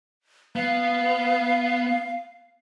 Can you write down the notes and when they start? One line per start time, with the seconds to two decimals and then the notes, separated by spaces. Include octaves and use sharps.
0.56 B3 F5